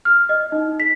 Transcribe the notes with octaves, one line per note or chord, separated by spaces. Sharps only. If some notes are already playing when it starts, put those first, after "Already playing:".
F6
D#5
D#4
B6